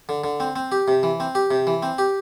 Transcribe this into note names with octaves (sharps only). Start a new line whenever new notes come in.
D3
D3
C4
C4
G4
C3
E3
C4
G4
C3
E3
C4
G4